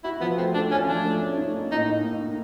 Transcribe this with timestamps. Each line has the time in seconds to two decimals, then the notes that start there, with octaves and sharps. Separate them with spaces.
0.04 E4 F#4
0.21 F3 B3
0.37 A3 C4
0.54 A3 D4
0.71 F3 C#4
0.87 F3 D4
1.04 A3
1.22 C#4
1.37 D#4
1.54 A#3
1.71 A2 D#4
1.88 D#4
2.05 A#3
2.21 D#4